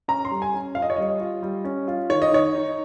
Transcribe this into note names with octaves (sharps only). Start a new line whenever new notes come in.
C#4 A#5
C6
G3
G#5
C#4
F4 F5
D#5
C#5
G3 D#5
F4
G3
C#4
F4
D#3 C#5
D#5
D#3 C#5
D#4